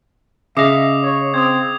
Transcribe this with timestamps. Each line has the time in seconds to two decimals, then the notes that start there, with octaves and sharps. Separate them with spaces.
0.57 C#3 G#4 D#5 E5 D6 D#6 C7
1.03 C#5
1.34 C4 D#6 G#6